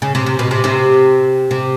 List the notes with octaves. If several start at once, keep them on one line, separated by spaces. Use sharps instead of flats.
C#3
C3
C3
B2
C3
C3
C3